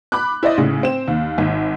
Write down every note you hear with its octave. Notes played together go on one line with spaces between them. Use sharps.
B5 D6 F#6
E4 C5 D5 D#5
A2 C#3
C4 E7
D#2
G#1